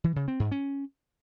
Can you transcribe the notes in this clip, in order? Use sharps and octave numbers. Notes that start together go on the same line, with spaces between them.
E3
C#3
C4
G#2
C#4